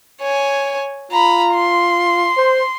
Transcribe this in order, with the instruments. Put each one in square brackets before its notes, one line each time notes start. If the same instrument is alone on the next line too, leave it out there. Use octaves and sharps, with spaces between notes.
[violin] C#5 G#5
[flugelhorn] F4 [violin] A#5 B5
[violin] C6
[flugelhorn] C5